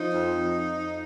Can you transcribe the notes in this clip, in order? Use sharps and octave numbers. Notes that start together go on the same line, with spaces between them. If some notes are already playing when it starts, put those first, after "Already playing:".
Already playing: F3 D#4
F2
F3
F2